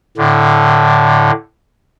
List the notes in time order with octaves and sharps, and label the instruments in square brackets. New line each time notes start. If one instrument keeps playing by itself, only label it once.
[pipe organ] A2 D3